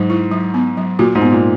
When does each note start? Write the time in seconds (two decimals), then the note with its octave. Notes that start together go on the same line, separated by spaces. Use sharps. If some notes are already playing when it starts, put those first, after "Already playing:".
Already playing: G#2 F#3
0.10 E4
0.31 F#3
0.54 B3
0.77 F#3
0.99 A#2 F#4
1.15 G#2
1.22 B3
1.32 A#2